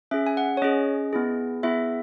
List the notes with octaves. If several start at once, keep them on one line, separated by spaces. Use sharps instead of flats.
C#4 G#4 E5
G#5
F#5
C#5
C#4 G#4 D#5
B3 E4 G#4
B3 E4 G#4 E5